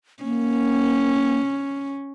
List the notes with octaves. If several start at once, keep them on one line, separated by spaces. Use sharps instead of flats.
A#3 C#4